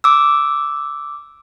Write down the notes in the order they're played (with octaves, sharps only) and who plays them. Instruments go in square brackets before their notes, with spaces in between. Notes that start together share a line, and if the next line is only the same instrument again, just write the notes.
[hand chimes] D6 E6